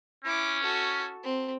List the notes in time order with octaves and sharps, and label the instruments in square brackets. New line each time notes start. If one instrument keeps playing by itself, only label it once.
[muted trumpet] C#4 [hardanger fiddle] E4 D6
[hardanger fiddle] F#4 A4
C4